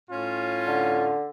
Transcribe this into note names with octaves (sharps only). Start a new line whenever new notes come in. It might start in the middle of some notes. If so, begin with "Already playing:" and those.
A2 C#4 F4
D3